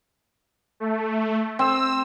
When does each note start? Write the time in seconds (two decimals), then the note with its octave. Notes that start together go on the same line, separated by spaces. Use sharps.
0.80 A3
1.59 C4 E6